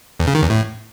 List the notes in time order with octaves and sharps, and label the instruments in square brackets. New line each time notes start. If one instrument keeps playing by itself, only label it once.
[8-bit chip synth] E2
C#3
D#3
E2
A2